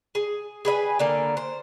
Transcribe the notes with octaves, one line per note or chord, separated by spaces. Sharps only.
G#4
G#4 B4 D#5 G#5
D3 A#3 F5
C5